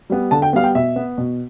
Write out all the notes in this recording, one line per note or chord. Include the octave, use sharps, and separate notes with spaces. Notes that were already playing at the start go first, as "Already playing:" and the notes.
G3 B3
D3 A5
G5
G3 B3 F5
G5
B2 E5
B3
B2